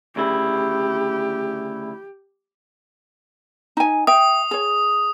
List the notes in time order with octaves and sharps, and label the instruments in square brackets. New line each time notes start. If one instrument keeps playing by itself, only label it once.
[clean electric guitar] D2 C#3 E4 [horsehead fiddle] G4
[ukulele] D#4 G#5
[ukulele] E5 G5 [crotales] D#6
[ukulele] G#4 C#5